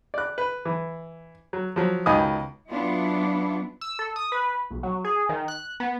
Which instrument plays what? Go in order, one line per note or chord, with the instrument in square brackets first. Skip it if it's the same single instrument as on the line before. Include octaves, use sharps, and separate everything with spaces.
[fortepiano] D5 F#6
B4
E3
F#3
F3 F#3
C#2 B2 D#3 D#5 G#5 D#6
[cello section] F#3 B3 D4 E4 F4
[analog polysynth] E6
A4
D#6
B4
B1
F#3
G#4
D#3
F#6
B3